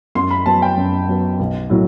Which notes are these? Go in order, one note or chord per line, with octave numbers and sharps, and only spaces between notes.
F#2 C6
B5
F#3 B3 A5
G5
F#2
F#3 B3
B1
A2 F#3